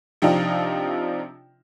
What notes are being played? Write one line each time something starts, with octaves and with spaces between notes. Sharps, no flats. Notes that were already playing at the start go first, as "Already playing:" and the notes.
C3 F3 C4 D4 D#4 F4